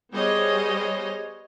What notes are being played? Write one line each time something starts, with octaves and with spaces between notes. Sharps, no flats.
G3 B3 G#4 C5 C#5 D#5